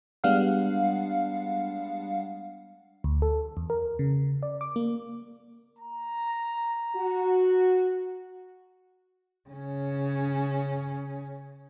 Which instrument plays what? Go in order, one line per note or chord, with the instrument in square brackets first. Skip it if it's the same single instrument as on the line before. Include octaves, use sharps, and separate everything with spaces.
[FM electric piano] G3 G#3 B3 D4 F5 F#5
D2
A4
E2
A#4
C#3
D5
D6
A#3
[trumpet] A#5
[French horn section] F#4
[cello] C#3 C#4